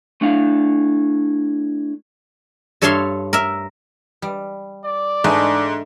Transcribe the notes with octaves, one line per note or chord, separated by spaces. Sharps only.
A3 D4 E4 F5
G2 A4 C#5 E5 F5 C6
A#4 E5
G3
D5
G#2 G#3 A3 D4